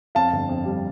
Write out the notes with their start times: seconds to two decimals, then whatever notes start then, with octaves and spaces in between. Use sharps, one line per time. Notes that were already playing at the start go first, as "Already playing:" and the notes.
0.15 F2 F5 A5
0.33 G1
0.49 F2
0.65 G3